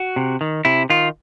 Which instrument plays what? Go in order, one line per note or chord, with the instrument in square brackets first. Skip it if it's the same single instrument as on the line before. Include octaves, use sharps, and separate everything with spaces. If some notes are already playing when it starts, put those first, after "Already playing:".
Already playing: [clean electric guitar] F#4
C3
D#3
C3 E4
D#3 F4